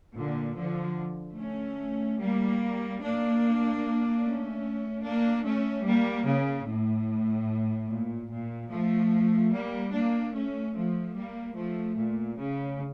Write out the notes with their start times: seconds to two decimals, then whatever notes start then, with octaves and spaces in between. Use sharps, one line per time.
0.16 A#2 D3
0.57 D3 F3
1.38 A3 C#4
2.19 G3 A#3
3.01 A#3 D4
4.23 A3 C#4
5.04 A#3 D4
5.45 A3 C#4
5.85 G3 A#3
6.26 C#3
6.67 A2
7.90 A#2
8.30 A#2
8.70 F3 A3
9.53 G3 A#3
9.93 A#3 D4
10.33 A3 C#4
10.74 F3 A3
11.14 G3 A#3
11.56 F3 A3
11.97 A#2
12.37 C#3